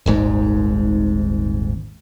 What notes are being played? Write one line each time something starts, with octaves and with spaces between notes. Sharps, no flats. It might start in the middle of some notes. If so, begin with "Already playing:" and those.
D#1 G#1 G#2